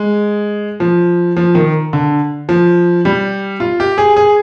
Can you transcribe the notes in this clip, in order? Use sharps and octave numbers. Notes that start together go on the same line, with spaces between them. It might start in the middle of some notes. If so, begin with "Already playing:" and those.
Already playing: G#3
F3
F3
D#3
D3
F3
G3
F4
G4
G#4
G#4